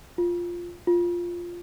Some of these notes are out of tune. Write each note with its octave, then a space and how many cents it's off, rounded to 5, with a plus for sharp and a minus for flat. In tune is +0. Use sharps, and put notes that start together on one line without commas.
F4 +0
F4 +0